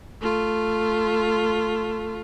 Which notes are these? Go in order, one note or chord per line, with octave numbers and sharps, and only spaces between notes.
A3 F4